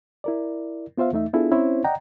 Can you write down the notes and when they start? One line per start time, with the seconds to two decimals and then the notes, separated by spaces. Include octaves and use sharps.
0.24 E4 A#4 D5
0.98 B3 F4 C5 E5 F5
1.13 E2 A3 D#4 E5
1.33 B3 D4 E4 F4 G#4 A4
1.51 C4 C#4 E4 C5 C#5
1.84 D5 D#5 F#5 G5 A#5